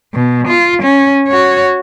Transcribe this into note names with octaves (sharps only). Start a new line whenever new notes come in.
B2
F4
C#4
F#4 C#5